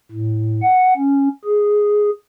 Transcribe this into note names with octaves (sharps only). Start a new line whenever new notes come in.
A2
F#5
C#4
G#4